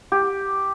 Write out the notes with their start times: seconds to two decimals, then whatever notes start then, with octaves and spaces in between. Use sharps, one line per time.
0.12 G4